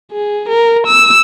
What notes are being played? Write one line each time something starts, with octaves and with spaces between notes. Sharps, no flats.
G#4
A#4
E6